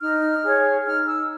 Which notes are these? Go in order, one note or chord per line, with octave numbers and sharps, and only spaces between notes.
D#4 F6
G#4 C#5
D#4 F6
E6